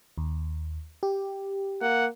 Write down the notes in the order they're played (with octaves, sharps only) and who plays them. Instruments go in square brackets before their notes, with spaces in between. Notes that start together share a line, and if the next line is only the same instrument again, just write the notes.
[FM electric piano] D#2
G4
[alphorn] A#3 [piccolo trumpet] F#5